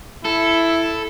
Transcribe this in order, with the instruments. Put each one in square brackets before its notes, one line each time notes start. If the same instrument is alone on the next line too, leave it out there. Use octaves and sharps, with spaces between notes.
[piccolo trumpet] E4 [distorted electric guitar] A4